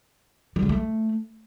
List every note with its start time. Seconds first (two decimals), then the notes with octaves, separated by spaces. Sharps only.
0.56 G3
0.63 C#3
0.69 A3